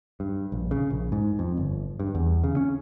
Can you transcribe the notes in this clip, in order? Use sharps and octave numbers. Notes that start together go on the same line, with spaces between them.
G2
A#1
C#3
A#1
G#2
F2
G1
G2
E2
C#3
C#4